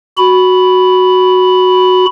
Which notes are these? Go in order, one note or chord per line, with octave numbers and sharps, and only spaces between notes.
F#4 B5